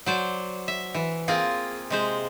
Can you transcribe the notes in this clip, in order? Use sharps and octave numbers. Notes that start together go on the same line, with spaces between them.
F#3 C5 D5
E5
E3
A#3 C4 F4 G#4
C3 G#3 C5